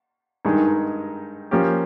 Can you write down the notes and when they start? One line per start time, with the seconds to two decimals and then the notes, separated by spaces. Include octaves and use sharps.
0.45 G2 D#3 G#3 D#4
1.51 F3 A#3 C#4 G4